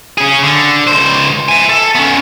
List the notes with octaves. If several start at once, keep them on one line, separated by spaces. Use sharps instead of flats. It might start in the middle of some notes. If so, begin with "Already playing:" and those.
C#4 G#4
D3
C#2 C5
E5 G#5
A4
B3 C#4